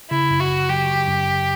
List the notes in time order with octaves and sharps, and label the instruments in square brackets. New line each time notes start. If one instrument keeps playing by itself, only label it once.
[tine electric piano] C#3 [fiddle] E4
[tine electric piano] F#2
[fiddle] F#4
[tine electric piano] G1
[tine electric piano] F#3 [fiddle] G4
[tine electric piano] C#3
F#2
G1